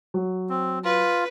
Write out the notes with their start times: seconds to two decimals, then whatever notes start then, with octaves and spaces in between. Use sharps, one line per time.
0.14 F#3
0.50 C4
0.84 F4 B4